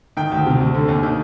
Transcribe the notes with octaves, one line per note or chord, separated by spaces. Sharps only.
D#3 G5
D2
C3
D2
D3
D#2
D#3